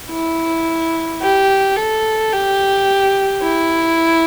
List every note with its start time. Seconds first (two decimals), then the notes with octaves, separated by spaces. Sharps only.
0.10 E4
1.21 G4
1.76 A4
2.32 G4
3.42 E4